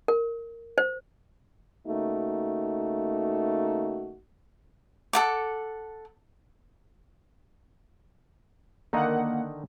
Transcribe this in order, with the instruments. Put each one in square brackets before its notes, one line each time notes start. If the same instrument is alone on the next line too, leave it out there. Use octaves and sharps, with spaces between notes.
[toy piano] A#4
C5
[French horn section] C#3 A3 A#3 D#4 F#4
[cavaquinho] A4 F#5 D6
[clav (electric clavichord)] D3 D#3 D#4 [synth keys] A#3 F#5